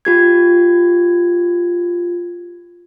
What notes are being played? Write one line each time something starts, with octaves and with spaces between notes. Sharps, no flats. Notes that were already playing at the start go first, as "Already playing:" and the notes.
F4 G4 G#6